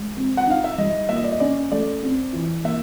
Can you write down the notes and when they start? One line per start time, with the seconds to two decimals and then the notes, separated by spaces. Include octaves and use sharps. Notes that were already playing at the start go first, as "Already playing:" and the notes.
Already playing: G#3
0.17 C4
0.37 F#5
0.47 D#4 F5
0.64 E5
0.78 G3 D#5
1.09 A#3 E5
1.16 D#5
1.24 D5
1.31 D#5
1.40 C#4 D5
1.72 A3 D5
2.03 C4
2.33 E3
2.64 A#3 E5